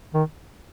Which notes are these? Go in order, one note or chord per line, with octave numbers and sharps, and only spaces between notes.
D#3